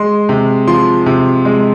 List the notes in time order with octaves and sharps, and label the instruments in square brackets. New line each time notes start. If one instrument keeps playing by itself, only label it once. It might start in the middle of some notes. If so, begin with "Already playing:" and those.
Already playing: [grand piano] G#3 C6
C3
F3 C6
C3
G#3